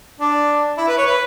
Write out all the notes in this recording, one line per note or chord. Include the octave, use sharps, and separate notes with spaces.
D4
E4
B4
C#5
B4